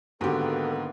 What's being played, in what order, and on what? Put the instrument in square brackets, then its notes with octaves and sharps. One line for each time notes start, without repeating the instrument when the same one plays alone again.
[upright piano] G#2 D3 [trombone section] D#3 A#3 B3 [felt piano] F#4 G4 [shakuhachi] A4